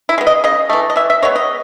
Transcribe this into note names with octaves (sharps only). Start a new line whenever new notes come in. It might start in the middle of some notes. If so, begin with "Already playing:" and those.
E4
G#3 B3
D#5
C#3 D#5
E3 A3
D#5
E3 E5
E5
G#3 B3 C#5
D#5